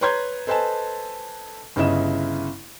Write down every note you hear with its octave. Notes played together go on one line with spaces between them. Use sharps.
B4 C#5 A#5 C6 G6 G#6
A4 B4 C5 D#5 G#5 A5
G1 C#3 E4 D#5 E7